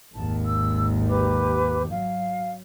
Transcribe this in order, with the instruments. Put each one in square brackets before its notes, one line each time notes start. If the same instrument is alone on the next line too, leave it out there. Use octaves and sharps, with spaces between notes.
[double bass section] G#1 D#2 [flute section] A5
[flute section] E6
G4 B4 D6
[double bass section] F#3 [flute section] F5